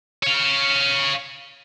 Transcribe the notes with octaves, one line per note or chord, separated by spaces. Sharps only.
C#5 F5